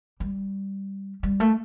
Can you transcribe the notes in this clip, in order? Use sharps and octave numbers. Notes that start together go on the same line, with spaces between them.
G3
G3
A3